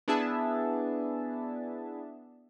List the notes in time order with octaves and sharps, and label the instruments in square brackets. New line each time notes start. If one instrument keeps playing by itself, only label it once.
[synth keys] B3 D4 E4 G#4 E5 A5